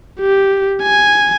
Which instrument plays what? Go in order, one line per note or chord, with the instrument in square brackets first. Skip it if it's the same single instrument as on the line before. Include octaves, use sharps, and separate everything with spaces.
[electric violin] G4
G#5